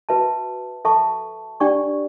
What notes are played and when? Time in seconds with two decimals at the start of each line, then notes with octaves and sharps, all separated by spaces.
0.09 F#4 B4 E5 A5
0.85 A4 E5 A5 C#6
1.60 D4 G4 D5 G5 C#6